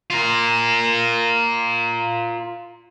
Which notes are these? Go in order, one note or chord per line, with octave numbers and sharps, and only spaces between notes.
F4 A#4